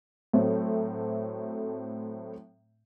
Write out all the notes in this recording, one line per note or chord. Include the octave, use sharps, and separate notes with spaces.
A2 F#3 A3 C4